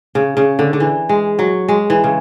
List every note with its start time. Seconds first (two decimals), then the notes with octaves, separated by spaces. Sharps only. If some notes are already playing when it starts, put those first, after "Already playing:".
0.15 C#3
0.37 C#3
0.59 D3
0.73 D3
0.80 E3
1.09 G#3
1.39 F#3
1.69 G#3
1.90 E3
2.04 C#3